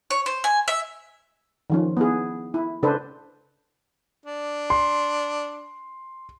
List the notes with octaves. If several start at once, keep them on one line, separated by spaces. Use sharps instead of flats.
C#5
C5
G#5
E5
D#3 F3 C#4
B3 E4 G#4
E4
C#3 D4 A4 B4 C5
D4
C6